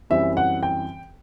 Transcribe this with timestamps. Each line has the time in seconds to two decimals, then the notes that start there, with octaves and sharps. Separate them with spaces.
0.10 F#2 E3 G3 C4 E5
0.37 F#5
0.63 G5